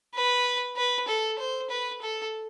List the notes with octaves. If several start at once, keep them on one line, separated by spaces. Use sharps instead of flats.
B4
B4
A4
C5
B4
A4